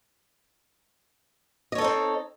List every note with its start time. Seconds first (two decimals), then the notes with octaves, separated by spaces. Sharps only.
1.72 D#5
1.75 C#5
1.78 A4
1.81 D#4
1.84 C4